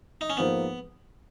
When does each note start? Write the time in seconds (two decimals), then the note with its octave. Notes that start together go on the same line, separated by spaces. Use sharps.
0.21 D#4
0.30 C#4
0.37 G#2 F3 A#3 B3